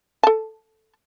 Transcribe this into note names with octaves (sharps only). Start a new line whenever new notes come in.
A4 A5